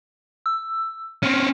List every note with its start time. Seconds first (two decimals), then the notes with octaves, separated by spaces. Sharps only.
0.46 E6
1.23 C4 C#4 F6